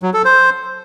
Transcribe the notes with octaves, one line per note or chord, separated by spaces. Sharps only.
F#3
A4
C5